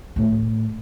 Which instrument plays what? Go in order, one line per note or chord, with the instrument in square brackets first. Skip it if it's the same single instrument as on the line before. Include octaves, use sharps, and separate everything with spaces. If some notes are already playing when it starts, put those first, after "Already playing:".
[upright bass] A2 A3